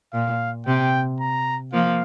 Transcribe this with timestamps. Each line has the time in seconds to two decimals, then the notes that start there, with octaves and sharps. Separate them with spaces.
0.14 A#2 F5
0.67 C3 G5
1.21 A#5
1.73 F3 A#3 F5